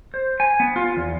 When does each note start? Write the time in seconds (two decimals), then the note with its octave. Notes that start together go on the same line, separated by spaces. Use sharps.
0.14 C5
0.40 G#5
0.60 B3
0.76 F4
0.97 E2